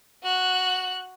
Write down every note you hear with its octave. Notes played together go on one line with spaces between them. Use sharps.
F#4 F#6